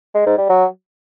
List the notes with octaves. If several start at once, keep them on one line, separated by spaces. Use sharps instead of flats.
G#3
G#2
G3
F#3